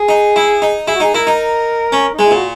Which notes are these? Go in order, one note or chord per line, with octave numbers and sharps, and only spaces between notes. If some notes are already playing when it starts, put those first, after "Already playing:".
Already playing: G#4
D#4
E4
D#4
E4 G#4
F#4
D#4 G#4
E4 A#4
D#4
C#4
G#3 D#4
E4
A#2 F#4